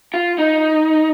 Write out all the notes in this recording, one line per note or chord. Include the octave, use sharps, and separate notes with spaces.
F4
D#4